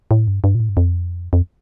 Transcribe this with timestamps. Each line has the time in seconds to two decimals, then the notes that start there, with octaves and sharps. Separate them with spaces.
0.11 A2
0.28 G2
0.44 G2
0.55 A#2
0.60 A2
0.69 G2
0.77 F2
1.33 F2